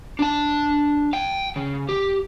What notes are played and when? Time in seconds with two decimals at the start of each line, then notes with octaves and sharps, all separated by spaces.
0.19 D4 A5
1.13 F5 G5
1.56 C#3
1.89 G4